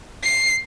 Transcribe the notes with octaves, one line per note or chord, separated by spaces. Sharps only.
C7